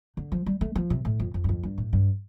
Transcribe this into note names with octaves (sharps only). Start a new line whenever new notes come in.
D3
F3
G3
A3
F3
C3
A2
F2
F2
G2
F2
G2
A2
G2